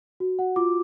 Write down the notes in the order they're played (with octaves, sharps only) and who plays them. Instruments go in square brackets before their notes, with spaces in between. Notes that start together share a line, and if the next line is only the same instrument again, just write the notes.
[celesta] F#4
F#4 F#5
F4 D6